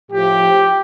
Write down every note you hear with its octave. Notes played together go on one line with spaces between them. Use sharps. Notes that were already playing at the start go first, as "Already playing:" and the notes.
A2 F3 G4